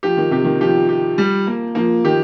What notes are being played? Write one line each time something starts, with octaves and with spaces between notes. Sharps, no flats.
F3 G4
D#3
C3 G4
D#3
F3 G4
G4
G3
A#3
F3 A#3
D#3 G4